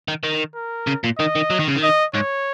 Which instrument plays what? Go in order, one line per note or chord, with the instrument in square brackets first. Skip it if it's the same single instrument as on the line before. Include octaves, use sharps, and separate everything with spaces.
[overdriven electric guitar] D#3
D#3
[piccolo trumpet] A#4
[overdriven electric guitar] C#3
A#2
[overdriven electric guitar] D#3 [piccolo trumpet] D#5
[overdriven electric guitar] D#3
F#3
D#3
C#3
D#3
[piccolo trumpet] D#5
[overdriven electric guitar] G#2 [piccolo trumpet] C#5